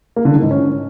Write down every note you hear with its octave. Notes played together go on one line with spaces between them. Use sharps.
A#3
D3
D#3
G#2
C#4